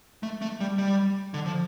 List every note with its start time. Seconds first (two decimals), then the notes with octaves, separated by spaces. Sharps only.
0.23 A3
0.42 A3
0.60 G3
0.78 G3
1.34 D3
1.46 F3